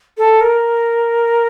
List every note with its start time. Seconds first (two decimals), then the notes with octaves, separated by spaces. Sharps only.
0.17 A4
0.40 A#4